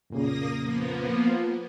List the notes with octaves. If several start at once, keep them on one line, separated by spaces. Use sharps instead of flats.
F2 A#2 C#3 A#3 D#6 A#6
F3 A#3 B3
F3 F4